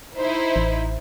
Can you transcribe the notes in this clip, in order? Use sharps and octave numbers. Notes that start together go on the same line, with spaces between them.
D#4 E4 C5
A1